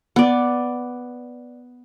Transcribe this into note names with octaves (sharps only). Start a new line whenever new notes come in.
B3 D5